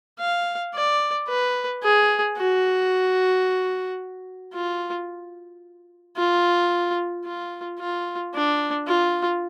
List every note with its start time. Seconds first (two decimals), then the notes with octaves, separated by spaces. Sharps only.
0.20 F5
0.75 D5
1.28 B4
1.83 G#4
2.37 F#4
4.54 F4
6.17 F4
7.25 F4
7.79 F4
8.34 D4
8.87 F4